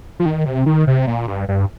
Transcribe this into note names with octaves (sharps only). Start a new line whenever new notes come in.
F3
D#3
C3
D#3
C3
A#2
G2
G2